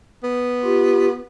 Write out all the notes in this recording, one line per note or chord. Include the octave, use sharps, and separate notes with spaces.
B3
F4 G4